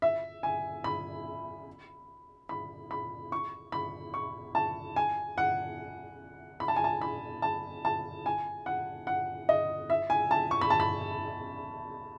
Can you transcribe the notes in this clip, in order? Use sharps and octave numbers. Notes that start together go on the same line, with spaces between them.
E5
G#5
B5
B5
B5
C#6
B5
C#6
A5
G#5
F#5
B5
A5
G#5
A5
B5
A5
A5
G#5
F#5
F#5
D#5
E5
G#5
A5
C#6
B5
A5
B5